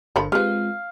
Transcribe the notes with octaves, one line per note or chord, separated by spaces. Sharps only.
G1 D3 F3 A4 A#4 B5
G#3 C4 F4 G4 B4 F5